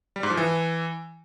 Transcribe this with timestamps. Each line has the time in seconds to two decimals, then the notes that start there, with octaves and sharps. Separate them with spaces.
0.16 G3
0.23 G#2
0.30 F3
0.37 E3